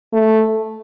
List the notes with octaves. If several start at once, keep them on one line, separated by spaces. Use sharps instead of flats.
A3